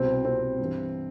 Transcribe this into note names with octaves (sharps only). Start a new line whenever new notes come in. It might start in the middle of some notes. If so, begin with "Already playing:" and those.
Already playing: C2 B2 G3 C4
C4
G2 E3 G3